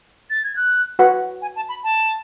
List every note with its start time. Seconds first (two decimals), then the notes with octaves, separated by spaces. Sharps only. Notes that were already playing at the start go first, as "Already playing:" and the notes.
0.30 A6
0.44 G#6
0.56 F#6
0.99 F#4 B4 F#5
1.42 G#5
1.56 A5
1.69 B5
1.84 A5